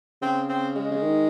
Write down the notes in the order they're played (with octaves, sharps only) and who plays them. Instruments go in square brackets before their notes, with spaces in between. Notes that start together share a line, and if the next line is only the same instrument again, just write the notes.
[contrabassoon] C#3 [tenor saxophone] C4
[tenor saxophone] C4
G#3
[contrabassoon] C#3
D#3